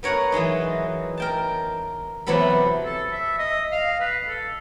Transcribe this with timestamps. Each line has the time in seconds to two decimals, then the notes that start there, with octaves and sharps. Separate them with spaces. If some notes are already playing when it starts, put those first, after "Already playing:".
0.03 B3 A#4 C#5 F#5 A#5
0.32 E3 F#3 G#3 D#4
1.17 A#4 G5 A5
2.26 C3 E3 F#3 B3 A4 B5
2.85 A4
3.12 E5
3.38 D#5
3.72 F5
4.00 B4
4.28 A4